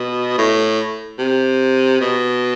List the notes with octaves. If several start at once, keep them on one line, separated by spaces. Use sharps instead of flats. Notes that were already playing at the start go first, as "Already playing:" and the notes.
Already playing: B2
A2
C3
B2